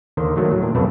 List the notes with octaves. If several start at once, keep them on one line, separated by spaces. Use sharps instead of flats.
D#2 D3 D#3 C5
D#3 F#3 A3 A#3
A2 F#3
A#2 D4
B1 F2 B2 D#3 A3 A5